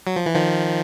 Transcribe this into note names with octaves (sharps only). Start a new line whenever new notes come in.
F#3
F3
E3
D#3 F3